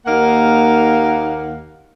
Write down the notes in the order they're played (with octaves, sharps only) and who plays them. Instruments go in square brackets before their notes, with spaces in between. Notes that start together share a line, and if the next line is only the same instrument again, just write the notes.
[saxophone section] D#2 A#3 D#4 A#4 F5 F#5